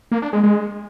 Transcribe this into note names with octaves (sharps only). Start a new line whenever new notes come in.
A#3
D4
G#3
G#3